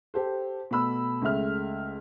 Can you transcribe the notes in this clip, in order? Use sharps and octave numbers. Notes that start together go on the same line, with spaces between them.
G4 A4 C5
B2 A3 B5 E6
C#2 C#3 A3 E5 F6